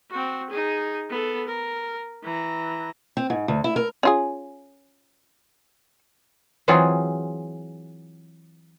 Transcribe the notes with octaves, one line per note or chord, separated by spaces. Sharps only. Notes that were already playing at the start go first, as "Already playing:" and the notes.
C4 F#4
D#4 G#4
B3 A4
A#4
E3 A#5
C4
G#2
D2
E4
A#4
C#4 F4 G#4
E3 F#3 C4 F4 G#4